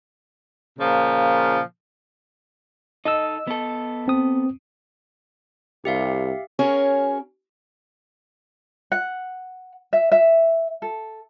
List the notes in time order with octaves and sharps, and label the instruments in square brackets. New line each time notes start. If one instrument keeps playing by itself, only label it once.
[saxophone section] A#2 C#3 F3
[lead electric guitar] D#4 A4 [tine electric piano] D#5 E6
[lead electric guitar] B3 A4
[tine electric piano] C4 D#6
[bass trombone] C2 [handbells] G4 E5 F5
[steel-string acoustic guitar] C#4 F#4 G#4 A#4 C#5
[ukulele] F#5
E5
E5
A4